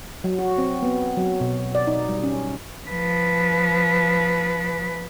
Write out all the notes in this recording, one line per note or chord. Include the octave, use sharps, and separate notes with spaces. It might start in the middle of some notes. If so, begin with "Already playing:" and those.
F#3
F#4
C4
B3
F#3
B2
D5
D#4
G3
C#4
F3 B4